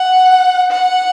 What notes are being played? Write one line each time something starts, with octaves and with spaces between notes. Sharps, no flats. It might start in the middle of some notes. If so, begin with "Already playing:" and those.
Already playing: F#5
F#5